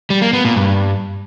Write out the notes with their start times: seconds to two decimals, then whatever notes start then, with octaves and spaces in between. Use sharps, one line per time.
0.10 G3
0.22 A#3
0.33 B3
0.45 A#2
0.56 G2